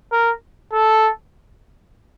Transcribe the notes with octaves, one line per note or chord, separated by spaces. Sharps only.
A#4
A4